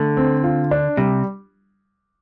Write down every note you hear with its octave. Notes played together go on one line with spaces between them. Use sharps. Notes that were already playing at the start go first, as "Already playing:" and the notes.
Already playing: D3 A3
C4
F4
D4
C3 G3